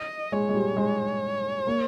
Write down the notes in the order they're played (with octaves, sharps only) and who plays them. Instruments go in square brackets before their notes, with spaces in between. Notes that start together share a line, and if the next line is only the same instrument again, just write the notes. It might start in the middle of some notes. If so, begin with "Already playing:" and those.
Already playing: [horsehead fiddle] D#5
[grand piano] G#3 [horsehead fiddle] C#5
[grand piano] G#3
G3
G#3
A#3